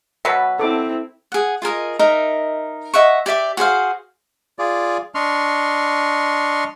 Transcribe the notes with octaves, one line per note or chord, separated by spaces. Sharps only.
B2 F#3 B4 E5 A5
C4 E4 A4 D6
G#4 F#5
F4 G#4 A#4 D#5
D#4 A#4 D#5 E5
D#5 E5 F#5 C#6
G4 D5 E5 D6
F#4 G#4 C5 F5
F4 G#4 D5
D4 D#5 C6 C#6 F6